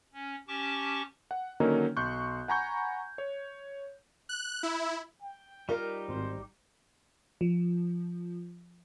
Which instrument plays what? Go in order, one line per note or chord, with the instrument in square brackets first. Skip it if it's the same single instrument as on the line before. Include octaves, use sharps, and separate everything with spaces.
[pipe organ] C#4
C#4 G4 A5 C#6 D6
[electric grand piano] F#5
D3 D#3 F#3 A#3 C#4 D#4
B1 C6 C#6 F#6 G6
F#5 G#5 A#5 B5 C#6 G6
C#5
[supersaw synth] F#6
E4
[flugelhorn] G5
[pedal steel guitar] G3 D#4 G4 [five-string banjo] F4 A#4
[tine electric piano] G#1 [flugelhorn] C5
[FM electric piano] F3